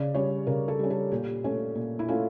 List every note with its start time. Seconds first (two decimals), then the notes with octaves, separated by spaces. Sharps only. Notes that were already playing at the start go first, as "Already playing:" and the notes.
Already playing: C#3 D5
0.14 G3 C#4 C#5
0.47 C#3 A#4
0.68 A4
0.79 G3 C#4
0.90 A4
1.12 A#2 G4
1.44 A3 C#4
1.75 A#2
1.99 E4
2.08 A3 C#4 F4